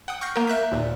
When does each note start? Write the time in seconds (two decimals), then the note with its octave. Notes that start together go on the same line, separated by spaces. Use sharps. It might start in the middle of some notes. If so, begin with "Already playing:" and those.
0.08 F#5 G5 D#6
0.21 C#6 F6 G6 A#6 C7
0.36 A#3 A#4
0.47 E5 F#6 G6 B6
0.72 D#2 A#2